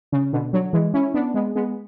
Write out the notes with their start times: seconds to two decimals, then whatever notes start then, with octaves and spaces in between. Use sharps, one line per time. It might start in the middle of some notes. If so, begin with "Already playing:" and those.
0.12 C#3
0.33 B2 D3
0.53 D3 F#3
0.73 E3 G#3
0.94 C#4 E4
1.14 B3 D4
1.34 G#3 B3
1.55 G#3 B3